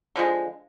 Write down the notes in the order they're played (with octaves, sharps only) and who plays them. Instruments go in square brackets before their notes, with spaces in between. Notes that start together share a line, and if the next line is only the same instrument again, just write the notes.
[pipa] D3 F3 G#3